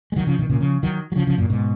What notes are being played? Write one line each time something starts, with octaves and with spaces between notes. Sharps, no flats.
G#3
D#3 F#3
C#3 F3
B2 D#3
A#2 C#3
C#3 F3
D#3 F#3
F#3
C#3 F3
C#3 F3
F#2 A#2
G#2 B2